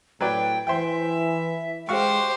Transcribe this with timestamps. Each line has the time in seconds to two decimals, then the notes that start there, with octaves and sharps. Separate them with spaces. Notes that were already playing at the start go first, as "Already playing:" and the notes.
0.21 A2 F#3 B4 D5 G5
0.67 E3 C5 E5 G5
1.89 G#3 F#4 G4 C5 F5 C#6